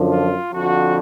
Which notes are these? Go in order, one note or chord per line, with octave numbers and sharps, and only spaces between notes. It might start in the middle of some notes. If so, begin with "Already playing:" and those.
Already playing: F#2 D3 F3
F4
F2 D3 F3 F#4